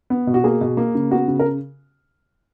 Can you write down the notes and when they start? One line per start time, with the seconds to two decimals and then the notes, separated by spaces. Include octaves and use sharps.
0.10 B3
0.27 B2
0.34 F#4
0.44 A#3 G#4
0.61 B2
0.77 A#3
0.95 C#3
1.11 B3 F#4
1.28 C#3
1.39 A#4